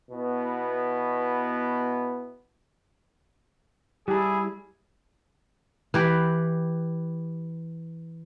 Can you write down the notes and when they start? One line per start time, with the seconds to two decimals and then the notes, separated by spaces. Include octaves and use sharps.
0.11 B2 B3 E4
4.08 G3 E4 G4 G#4 A5
5.94 E3 G4 B4